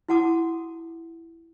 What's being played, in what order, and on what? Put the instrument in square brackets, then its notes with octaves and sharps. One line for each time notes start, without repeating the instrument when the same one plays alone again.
[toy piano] E4 F#4 F#5 A5 D6 D#6